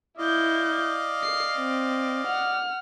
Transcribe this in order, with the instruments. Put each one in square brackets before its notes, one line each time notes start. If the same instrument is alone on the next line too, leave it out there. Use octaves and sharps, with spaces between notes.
[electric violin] E4 G6 [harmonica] D5 D#5 F5
[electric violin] C7
C4
F#5 F6